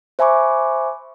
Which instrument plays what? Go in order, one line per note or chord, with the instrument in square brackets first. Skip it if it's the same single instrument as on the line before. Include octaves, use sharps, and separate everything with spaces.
[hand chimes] C5 E5 G#5 B5 C#6 D6